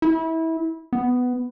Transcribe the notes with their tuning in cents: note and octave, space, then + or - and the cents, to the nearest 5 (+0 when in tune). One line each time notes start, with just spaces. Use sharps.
E4 -25
B3 +10